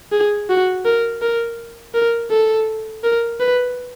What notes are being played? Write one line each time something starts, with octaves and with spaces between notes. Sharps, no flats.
G#4
F#4
A#4
A#4
A#4
A4
A#4
B4